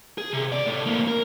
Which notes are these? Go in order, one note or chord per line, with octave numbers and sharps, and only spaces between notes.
G#4
C3
C#2 D5
A2
F2 A#3
A#4